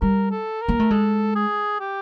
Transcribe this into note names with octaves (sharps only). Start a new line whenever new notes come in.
G3 A#4
A4
A#4
A#3
A3
G#3 A4
G#4
G4